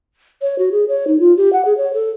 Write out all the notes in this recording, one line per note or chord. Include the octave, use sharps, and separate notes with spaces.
C#5
F#4
G#4
C#5
D#4
F4
G4
F#5
G#4
C#5
A4